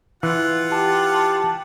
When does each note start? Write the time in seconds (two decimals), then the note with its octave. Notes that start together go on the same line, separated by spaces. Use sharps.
0.23 E3 F4 F#5
0.72 G4 A5